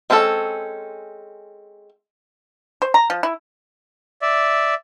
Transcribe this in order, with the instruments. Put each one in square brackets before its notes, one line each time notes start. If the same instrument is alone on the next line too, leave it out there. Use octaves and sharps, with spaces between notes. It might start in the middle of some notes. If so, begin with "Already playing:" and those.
[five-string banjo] G#3 C4 C#4 E4 A4
[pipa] C5
A#5
F3
E4
[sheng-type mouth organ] D5 E5